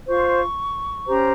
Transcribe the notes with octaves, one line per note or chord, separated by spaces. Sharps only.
F4 C5 C#6
C#4 G4 C5 A#5